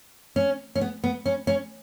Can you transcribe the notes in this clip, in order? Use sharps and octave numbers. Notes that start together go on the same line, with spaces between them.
C#4
C#4
B3
B3
C#4
C#4